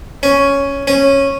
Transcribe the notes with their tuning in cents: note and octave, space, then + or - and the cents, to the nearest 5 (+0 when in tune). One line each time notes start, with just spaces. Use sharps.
C#4 +5
C#4 -10